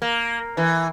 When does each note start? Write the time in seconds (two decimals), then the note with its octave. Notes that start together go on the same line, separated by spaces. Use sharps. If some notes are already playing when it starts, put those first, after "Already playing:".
0.02 A#3
0.57 E3